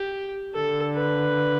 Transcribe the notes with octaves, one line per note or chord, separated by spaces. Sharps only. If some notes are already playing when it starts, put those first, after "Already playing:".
Already playing: G4
D3 A4
B4